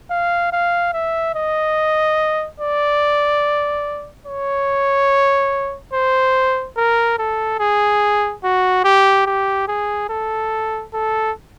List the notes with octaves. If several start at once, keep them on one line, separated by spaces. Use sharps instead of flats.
F5
F5
E5
D#5
D5
C#5
C5
A#4
A4
G#4
F#4
G4
G4
G#4
A4
A4